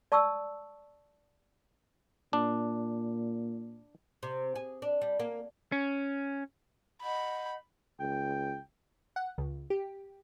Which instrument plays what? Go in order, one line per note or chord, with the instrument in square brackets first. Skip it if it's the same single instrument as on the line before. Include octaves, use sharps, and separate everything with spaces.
[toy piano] D5 A5 C#6 D#6 E6
[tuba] A#2 [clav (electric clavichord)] D4
[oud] C3
G#4
D4
G3
A#3
[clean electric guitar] C#4
[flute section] D#5 F#5 G6 [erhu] B5
[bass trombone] C#2 [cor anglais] G5
[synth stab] F#5
C#2
G4